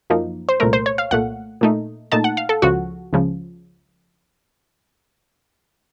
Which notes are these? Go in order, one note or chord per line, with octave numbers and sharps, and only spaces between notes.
F#2 F3 A#3 D#4
C5
C2 A#2 A3 A#4
C5
C#5
F5
C2 A#2 A3 F#5
A#2 A3 D#4
A#2 A3 D#4 A5
F#5
F5
A4
C#2 C#3 F3 F#4
C#2 C#3 F3